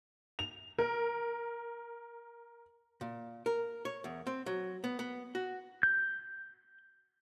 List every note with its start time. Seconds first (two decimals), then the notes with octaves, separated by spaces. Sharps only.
0.39 F7
0.78 A#4
3.01 A#2
3.46 A#4
3.85 C#5
4.04 E2
4.27 C4
4.46 F#3
4.84 B3
4.99 B3
5.35 F#4
5.83 G6